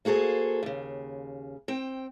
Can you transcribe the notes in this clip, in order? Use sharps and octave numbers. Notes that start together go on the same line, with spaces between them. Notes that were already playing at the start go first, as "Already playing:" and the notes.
A#3 F#4 G#4 A4 C5
D#2 C#3
C4 G5